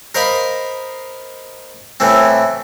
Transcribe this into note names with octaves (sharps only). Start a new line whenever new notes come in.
A#4 C5 D#5 F5 B5
A2 E3 A3 C4